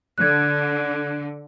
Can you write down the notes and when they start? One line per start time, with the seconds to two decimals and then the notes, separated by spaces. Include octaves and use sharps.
0.18 D3 F#6 G#6